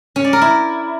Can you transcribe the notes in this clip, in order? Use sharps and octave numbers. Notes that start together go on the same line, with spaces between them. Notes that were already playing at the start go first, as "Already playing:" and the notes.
C#4
D5
A#4
E4